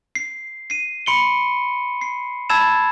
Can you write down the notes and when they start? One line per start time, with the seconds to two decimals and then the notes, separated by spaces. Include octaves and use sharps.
0.15 C7
0.70 C7 D#7
1.06 B5 C6 C#7 D7 G7
2.01 C7
2.50 A5 B5 E6 G#6 A6 E7